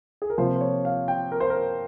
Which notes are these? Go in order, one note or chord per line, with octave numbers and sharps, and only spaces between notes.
G#4
A#4
C3 F3 A#3 F4 C5
C5
C#5
F5
G5
A#4
C5
A#4